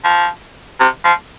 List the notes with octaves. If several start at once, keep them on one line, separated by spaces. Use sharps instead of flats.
F3
C3
F3